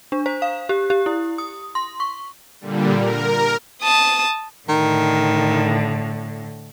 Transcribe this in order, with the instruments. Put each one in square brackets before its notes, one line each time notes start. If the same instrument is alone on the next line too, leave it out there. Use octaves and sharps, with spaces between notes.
[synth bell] D4
C5
F5
G4
G4
E4
D#6
C6
C#6
[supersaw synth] A#2 D3 G3
A#4
[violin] A5 D#6
[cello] A2 D3 [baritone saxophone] D#3